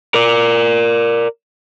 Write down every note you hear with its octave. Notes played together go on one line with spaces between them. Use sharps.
A#4 D5